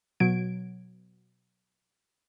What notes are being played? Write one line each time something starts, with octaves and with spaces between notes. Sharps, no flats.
B2 F#3 G#6 D7